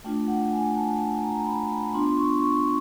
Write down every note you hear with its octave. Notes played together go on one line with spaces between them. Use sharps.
A3 D4 F4 G5
F#5
G#5
A5
A#5
B5
B5
B3 D4 F4 C6
C#6
C#6
C#6